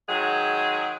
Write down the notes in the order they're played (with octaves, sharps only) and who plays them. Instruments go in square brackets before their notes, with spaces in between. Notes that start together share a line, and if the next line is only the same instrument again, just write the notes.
[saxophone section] D#3 F#3 G#3 G#4